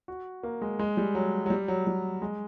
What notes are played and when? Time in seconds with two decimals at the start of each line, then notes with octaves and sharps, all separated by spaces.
0.08 F#4
0.43 A#3
0.62 G#3
0.79 G#3
0.97 G3
1.15 F#3
1.46 F#3
1.50 G3
1.68 F#3
1.87 G3
2.22 G#3